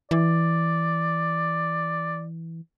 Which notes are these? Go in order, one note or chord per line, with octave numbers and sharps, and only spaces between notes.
E3 D5